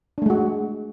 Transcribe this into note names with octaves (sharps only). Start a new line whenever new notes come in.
G#3 A3 D4 F#4